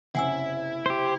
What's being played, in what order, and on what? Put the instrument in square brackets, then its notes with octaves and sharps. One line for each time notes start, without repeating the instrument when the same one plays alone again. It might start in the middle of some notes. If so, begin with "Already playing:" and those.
[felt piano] F#1 C3 C#4 [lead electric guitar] E4 [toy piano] F#5 G#5 E6
[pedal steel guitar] G4 C5